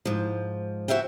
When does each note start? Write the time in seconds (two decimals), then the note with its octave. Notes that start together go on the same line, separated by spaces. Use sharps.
0.05 G#2 F3
0.88 F#4 C5 E5 F5 G5